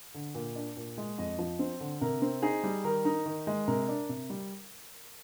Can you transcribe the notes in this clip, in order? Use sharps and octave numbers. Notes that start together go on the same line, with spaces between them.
D3
A#2
D4
A#2
G#3
F2 D#5
F3
C4 C5
D3
C3 A#4
C4
D#4 G#4
G3
D#3 A#4
D#4
D#3
G#3
C3 A#4
D4
C3
G3